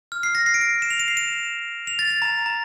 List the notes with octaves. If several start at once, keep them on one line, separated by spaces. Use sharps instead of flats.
F6
C7
A#6
C7
D7
C7
E7
F7
E7
C7
E7
F7
A6
A6
A#5
A#5